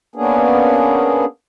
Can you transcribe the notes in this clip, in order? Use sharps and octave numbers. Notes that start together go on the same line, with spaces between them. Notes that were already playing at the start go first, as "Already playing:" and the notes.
A#3 B3 C#4 D4 G#4